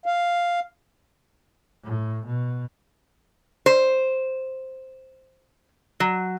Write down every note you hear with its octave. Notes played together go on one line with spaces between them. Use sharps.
F5
A2
B2
C5
F#3